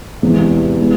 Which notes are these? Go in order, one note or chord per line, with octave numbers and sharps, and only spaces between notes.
E2 C3 G#3 B3 E4
G#3 B3 E4